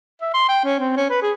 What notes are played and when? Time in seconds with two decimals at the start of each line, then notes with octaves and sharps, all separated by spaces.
0.21 E5
0.34 C6
0.49 G5
0.65 C#4
0.80 C4
0.97 C#4
1.10 B4
1.22 G#4